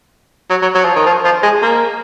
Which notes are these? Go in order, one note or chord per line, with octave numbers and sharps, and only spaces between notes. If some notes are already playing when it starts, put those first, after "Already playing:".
F#3
F#3
F#3
F3
D#3
F3
F3
G#3
A#3